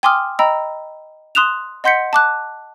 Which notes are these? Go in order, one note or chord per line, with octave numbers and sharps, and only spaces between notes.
G5 G#5 C6 D6 D#6 F6
D#5 G5 A#5 B5 E6
C6 D#6 F#6 E7 F7
D#5 F#5 C6 G6 B6 C#7
A5 D6 F#6